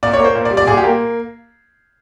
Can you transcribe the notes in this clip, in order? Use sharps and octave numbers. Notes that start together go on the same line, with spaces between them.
A#2 D5
C#5
A#3 C5
A#2
D5
G3
D5
A#2 G#4
G4
A#3